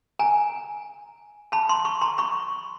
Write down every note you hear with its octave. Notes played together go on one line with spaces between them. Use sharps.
G#5 A#5
A5 B5
A#5 C6
C6
B5 C#6
A#5 C6
B5 C#6